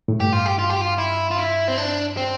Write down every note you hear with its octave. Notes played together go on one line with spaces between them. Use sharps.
A2
G2 G4
F4
G4
F4
G4
F4
E4
F4
E4
C4
D4
C4